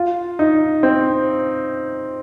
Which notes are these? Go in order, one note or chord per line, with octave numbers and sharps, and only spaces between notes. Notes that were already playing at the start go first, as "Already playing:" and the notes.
Already playing: F4
D#4
C4